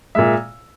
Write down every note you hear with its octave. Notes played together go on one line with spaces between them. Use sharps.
A#2 G#3 E5